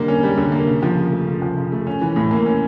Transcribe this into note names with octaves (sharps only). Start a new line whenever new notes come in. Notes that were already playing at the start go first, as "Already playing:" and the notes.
Already playing: D3 G3 A#3
C#4
G3
D3
A#3
C#3
F3
C#3
A3
C#3
F3
C#3
A3
C#4
E3
A2
A#3
C#4